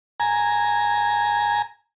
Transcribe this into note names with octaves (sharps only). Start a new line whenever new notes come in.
G#5 A#5